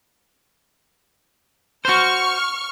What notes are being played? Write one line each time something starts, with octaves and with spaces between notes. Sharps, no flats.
F#4 C5 C#6 F6